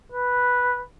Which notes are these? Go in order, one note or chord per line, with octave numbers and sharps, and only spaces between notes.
B4